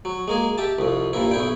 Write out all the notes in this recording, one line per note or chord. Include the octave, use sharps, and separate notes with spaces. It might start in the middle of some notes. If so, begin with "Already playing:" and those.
F#3
G#3 A#3 G#4
G4 E5 A5
C2 F2
G2 A#2 E4
B1 E4 G5